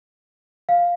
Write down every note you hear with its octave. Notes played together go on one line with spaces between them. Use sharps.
F5